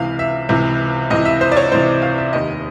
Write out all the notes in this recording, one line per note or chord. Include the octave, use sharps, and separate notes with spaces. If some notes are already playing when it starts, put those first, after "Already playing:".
Already playing: C#2 C3 E3 F5
E5
C#2 C3 E3
C#2 C3 E3 D#5
E5
C5
D5
C#5
C#2 C3 E3 C5
F5
E5
F1 D#2 D#3 D#5